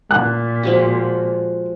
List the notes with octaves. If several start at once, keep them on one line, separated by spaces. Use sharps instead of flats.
A#2 F#6
F3 G#3 F#4